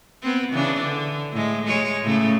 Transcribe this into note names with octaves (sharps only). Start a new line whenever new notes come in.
B3 C4
C#3 E3 D4
D3
A2 G#3
G#3 C#5
A2 C#3 A3